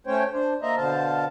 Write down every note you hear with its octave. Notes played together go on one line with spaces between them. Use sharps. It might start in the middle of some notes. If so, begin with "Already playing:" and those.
A3 C#4 C5 C#5 G5
D4 C5
A#3 C5 D#5 E5 A#5
B2 D3 C5 F5 A5